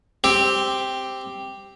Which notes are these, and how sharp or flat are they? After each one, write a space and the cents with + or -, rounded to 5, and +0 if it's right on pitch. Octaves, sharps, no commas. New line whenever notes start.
C4 +0 G4 +0